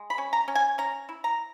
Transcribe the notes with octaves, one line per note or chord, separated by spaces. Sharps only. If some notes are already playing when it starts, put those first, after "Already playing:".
Already playing: G#3
B5
C#4
A#5
C#4
G#5
C#4 A#5
E4
A#5